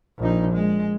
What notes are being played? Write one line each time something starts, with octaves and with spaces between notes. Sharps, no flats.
A#1 D#4
G#3